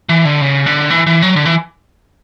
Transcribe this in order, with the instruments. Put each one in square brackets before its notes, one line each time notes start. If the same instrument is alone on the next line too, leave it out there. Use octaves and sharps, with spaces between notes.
[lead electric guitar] E3
D3
C#3
D3
E3
E3
F#3
D3
E3